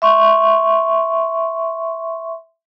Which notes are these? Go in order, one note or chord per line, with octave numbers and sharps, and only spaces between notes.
E5 C6 C#6